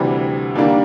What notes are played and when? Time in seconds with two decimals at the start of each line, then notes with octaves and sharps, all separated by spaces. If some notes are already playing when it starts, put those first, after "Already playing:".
Already playing: D2 C3 E3 G3
0.56 D#2 D3 G3 A#3 D4